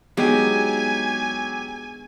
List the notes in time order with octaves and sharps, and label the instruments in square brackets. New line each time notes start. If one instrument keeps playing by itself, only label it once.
[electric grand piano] F#3 G4 [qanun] G#3 [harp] B3 D4 D#4 [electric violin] G#5